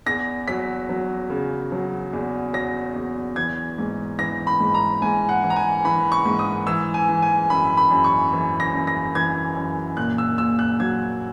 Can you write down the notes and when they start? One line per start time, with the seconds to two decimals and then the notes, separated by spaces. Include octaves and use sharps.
0.06 E2 A#6
0.48 F#3 B6
0.89 F#3
1.30 C#3
1.72 F#3
2.13 E2
2.54 F#3 A#6
2.96 E2
3.36 E3 G#6
3.78 G#2
4.19 E3 A#6
4.47 B5
4.60 G#2
4.74 A#5
5.02 G#2 G#5
5.29 F#5
5.43 E3
5.50 A#5
5.56 G#5
5.85 E3 B5
6.12 C#6
6.26 G#2
6.39 D#6
6.67 E3 E6
6.94 G#5
7.08 E3
7.22 G#5
7.50 F#2 B5
7.77 B5
7.91 F#2
8.04 C#6
8.33 E3
8.60 A#6
8.73 F#2
8.87 A#6
9.15 E3 G#6
9.56 F#2
9.97 A#2 F#6
10.18 E6
10.38 A#2 E6
10.59 F#6
10.80 F#3 G#6